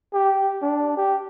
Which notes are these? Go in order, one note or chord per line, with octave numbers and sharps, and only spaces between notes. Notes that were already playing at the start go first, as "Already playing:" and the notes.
G4
D4
G4